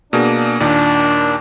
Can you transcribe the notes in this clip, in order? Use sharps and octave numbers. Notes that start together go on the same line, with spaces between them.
B2 A#3 D4 G#4
D#2 A#2 D#3 D4